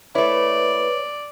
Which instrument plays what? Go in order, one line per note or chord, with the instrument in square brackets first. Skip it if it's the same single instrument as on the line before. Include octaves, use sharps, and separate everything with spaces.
[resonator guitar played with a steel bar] A3 E4 [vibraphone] B4 [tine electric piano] C#5 [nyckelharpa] D5